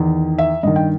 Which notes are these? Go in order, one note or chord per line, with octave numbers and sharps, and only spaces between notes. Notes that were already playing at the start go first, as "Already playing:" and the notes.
Already playing: E2 D#3
E5
G2 D#3 D#5
G5